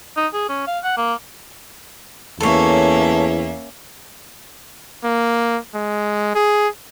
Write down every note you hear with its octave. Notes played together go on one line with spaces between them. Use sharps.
D#4
G#4
C#4
F5
F#5
A#3
E2 A#3 C#4 A4 C#5 E5
A#3
G#3
G#4